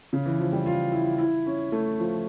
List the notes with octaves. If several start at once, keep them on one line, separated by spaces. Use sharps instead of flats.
C#3
E3
F3
G3
F4
E4
E4
C#4
A3
F3